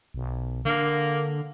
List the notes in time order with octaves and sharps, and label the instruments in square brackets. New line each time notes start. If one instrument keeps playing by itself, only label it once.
[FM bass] B1
[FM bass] D3 [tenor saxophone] A#3